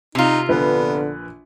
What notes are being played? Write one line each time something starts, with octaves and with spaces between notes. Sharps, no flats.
C3 D#4 F4
A#1 D3 B3 B4